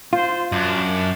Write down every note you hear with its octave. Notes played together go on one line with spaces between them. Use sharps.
F4 C5
F#2 D4